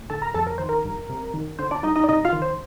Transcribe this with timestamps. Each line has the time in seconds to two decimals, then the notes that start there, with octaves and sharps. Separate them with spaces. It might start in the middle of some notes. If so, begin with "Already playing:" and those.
Already playing: A2
0.10 D3 A4 A5
0.22 A#4 A#5
0.34 F2 A4 A5
0.47 A#4
0.58 D#3 C5
0.69 A#4
0.85 G2
1.09 C3
1.34 D#3
1.59 D3 C5
1.71 D4 D5
1.83 G2 D#4 D#5
1.96 D#4 D#5
2.04 D5
2.09 C3 D#4 D#5
2.25 F4 F5
2.33 D#3
2.42 C5